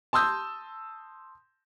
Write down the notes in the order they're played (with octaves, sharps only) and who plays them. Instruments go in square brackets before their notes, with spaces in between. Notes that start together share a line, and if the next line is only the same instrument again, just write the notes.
[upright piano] A5 C6 D#6 E6 G6